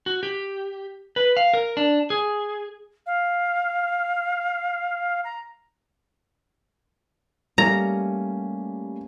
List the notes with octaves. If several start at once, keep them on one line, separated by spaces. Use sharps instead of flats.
F#4
G4
B4
F5
A#4
D4
G#4
F5
A#5
G3 A3 A#3 C#4 A#5